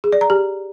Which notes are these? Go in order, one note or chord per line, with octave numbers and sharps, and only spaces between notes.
G#4
D5
A#5
G4